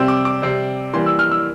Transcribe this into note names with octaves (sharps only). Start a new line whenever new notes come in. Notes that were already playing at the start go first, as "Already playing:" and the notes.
Already playing: C3 G3 C4 E6
D6
D6
C3 G3 C4
E3 G3 A#3 C6
E6
F6
E6